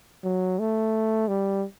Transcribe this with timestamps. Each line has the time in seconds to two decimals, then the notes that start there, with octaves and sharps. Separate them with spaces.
0.24 F#3
0.59 A3
1.28 G3